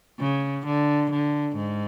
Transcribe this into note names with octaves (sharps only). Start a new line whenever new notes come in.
C#3
D3
D3
G#2